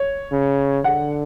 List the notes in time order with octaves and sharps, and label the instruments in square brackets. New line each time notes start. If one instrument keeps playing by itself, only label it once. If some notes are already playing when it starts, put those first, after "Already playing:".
Already playing: [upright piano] C#5
[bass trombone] C#3
[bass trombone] D3 [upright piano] F#5